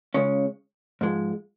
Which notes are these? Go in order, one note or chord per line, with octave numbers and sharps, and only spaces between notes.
C#2 C#3 G#3 C#4
G#2 F3 G#3